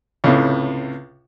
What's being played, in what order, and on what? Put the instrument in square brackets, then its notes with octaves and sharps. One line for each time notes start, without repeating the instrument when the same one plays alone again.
[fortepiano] C#2 A2 C3